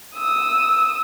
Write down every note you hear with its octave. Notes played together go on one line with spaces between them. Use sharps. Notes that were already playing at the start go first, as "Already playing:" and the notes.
D#6 E6